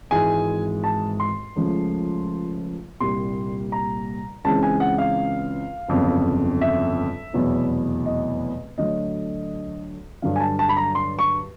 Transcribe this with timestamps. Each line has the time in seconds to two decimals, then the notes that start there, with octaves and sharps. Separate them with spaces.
0.11 G#1 G#2 E3 G#3 G#5
0.84 A5
1.20 C6
1.56 C#2 C#3 F3 A3
3.00 C2 A#2 G3 A#3 C6
3.72 A#5
4.44 C#2 C#3 E3 G#3 C4 A5
4.63 G#5
4.80 F#5
4.98 F5
5.88 G1 F2 C#3 F#3 B3
6.61 E5
7.33 F1 E2 B2 F#3 B3
8.06 D#5
8.78 D2 D3 F#3 D#5
10.22 G2 D3 F#3 F5
10.36 G#5
10.40 A5
10.59 A5
10.69 B5
10.77 A#5
10.95 C6
11.19 C#6